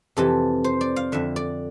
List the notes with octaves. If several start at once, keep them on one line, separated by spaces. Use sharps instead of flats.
F2 C3 E3 A4
C5
D5
F5
F2 D3 E5
D5